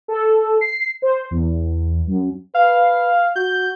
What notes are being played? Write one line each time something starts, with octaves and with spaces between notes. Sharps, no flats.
A4
C7
C5
E2
F#2
B4 F5
F#4 G6